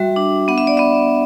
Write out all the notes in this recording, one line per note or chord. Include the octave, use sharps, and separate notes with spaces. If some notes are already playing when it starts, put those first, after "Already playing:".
Already playing: G3 F#4 E5
D4
B3 F#5
E5
D5
B3 E5